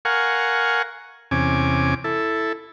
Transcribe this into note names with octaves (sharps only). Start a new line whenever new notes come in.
A#4 F5 F#5 G#5 C#6
E2 C3 C#4 G#5 D6
E4 A4